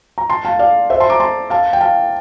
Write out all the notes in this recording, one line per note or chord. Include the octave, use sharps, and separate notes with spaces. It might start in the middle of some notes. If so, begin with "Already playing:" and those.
A#5
A5 C6
F5 A5
D5 F5
C5 E5
A5 C6
A#5 D6
A5 C6
F5 A5
G5
F5 A5